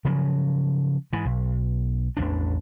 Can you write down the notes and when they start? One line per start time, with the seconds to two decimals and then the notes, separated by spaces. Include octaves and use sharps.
0.05 C#3 F3 F#3
1.13 G#2 E3
1.25 B1
2.17 A1 E2 G2 D4